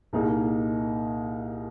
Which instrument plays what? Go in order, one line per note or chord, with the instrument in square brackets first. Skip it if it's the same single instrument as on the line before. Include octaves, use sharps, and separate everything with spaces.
[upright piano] C2 A#2 A#3 D#4 G#4